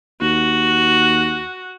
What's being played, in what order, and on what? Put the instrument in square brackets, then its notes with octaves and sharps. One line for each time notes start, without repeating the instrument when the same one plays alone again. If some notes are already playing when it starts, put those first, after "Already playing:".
[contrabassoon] D#2 [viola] F#4